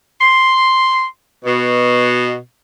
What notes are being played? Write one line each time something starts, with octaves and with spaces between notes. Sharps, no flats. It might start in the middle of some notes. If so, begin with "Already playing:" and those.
C6
B2